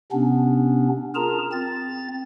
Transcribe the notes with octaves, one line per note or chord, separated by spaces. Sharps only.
C3 B3 C#4 D4
F4 G#4 A#4 A5 A#5
C4 A6